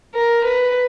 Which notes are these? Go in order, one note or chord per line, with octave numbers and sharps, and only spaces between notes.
A#4
B4